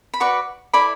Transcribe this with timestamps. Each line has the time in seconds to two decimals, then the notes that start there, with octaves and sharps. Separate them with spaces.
0.14 B5
0.20 F#4 B4 D5 C#6
0.73 E4 A4 D5 B5